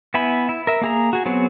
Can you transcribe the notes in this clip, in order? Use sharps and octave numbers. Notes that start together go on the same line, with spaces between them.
B3 E4 E5 G#5 B5
E4
A#4 E5
A#3 G#4 A#5
F#4 G#4
F#3 B3 C4 F#4 G#4